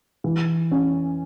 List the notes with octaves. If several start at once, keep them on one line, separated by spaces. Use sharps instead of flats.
E3
C#4